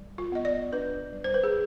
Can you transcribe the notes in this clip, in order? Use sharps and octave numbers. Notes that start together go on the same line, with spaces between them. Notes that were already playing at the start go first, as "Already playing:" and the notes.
Already playing: G3
F4
B3 D#5
D5
D4 B4
G3
C5
B4
G#4